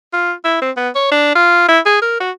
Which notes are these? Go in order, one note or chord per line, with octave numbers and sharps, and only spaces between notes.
F4
E4
C4
B3
C#5
D4
F4
E4
G#4
A#4
F#4